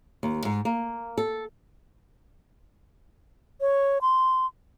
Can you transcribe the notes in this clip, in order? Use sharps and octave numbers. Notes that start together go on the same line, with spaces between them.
D#2
G#2
A#3
A4
C#5
C6